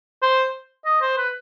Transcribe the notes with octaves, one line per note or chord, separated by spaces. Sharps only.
C5
D#5
C5
B4